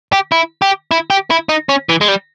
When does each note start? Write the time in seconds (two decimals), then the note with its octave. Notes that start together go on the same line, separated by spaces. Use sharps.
0.12 G4
0.32 E4
0.62 G4
0.91 E4
1.10 G4
1.30 E4
1.49 D#4
1.69 C#4
1.89 E3
2.01 G#3
2.08 G3